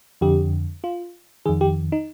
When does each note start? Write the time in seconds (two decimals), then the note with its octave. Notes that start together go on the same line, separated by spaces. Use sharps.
0.21 F2 D3 G4
0.84 F4
1.46 F2 D#3 G#4
1.61 G4
1.92 D#4